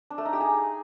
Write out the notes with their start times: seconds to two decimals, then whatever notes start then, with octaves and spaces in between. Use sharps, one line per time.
0.10 D4
0.18 A3
0.25 D#4
0.33 G4
0.40 G#4